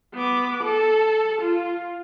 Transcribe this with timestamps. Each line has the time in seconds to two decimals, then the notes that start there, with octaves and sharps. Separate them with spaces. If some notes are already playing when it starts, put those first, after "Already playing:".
0.14 B3 D6
0.63 A4
1.42 F4